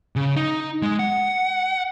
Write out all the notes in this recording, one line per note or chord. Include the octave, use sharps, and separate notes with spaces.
C#3
D#4
G#3
F#5